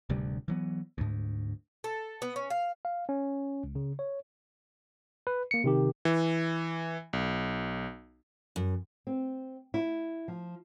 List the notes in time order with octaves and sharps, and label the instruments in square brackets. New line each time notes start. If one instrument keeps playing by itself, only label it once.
[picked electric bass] D1 D2 C3 G3
E3 F#3 B3
D2 G#2
[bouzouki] A4
B3
C#4
F5
[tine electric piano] F5
C#4
C#2
C#3
C#5
B4
A#3 C#7
C3 D#3 G4
[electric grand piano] E3
B1
[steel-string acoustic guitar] F#2
[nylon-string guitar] C4
E4
F3